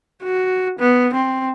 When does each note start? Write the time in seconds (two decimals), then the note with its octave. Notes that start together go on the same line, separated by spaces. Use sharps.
0.23 F#4
0.79 B3
1.14 C4